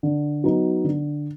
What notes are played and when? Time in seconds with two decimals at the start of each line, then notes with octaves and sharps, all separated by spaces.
0.03 D3
0.44 F#3 B3 D#4
0.84 D3